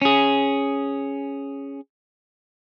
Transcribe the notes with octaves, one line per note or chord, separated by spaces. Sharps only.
C#4 G#4